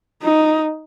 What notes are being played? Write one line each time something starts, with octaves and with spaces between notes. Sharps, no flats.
D#4